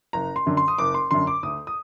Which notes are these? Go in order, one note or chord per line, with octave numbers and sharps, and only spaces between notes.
F#1 A#5
C6
F#2 D3
C6
D#6
F#1 D6
C6
F#2 D3 C6
D6
D2 D#6
D#6